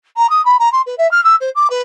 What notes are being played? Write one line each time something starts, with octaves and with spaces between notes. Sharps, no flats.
A#5
D#6
B5
A#5
C6
B4
E5
F6
E6
C5
D6
B4